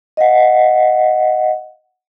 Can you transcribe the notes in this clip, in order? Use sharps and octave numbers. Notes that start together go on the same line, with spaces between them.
D#5 F5 F#5